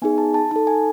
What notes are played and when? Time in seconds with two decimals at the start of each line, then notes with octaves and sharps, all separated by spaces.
0.02 B3 D#4 G#4 G#5
0.18 A5
0.34 A5
0.51 D#4 A4 A5
0.67 G#5